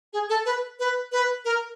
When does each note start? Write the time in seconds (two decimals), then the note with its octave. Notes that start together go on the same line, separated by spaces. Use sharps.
0.13 G#4
0.29 A4
0.46 B4
0.79 B4
1.12 B4
1.45 A#4